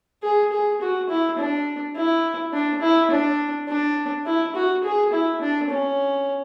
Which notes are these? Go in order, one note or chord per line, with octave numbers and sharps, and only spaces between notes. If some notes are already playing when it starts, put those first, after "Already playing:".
G#4
G#4
F#4
E4
D4
E4
D4
E4
D4
D4
E4
F#4
G#4
E4
D4
C#4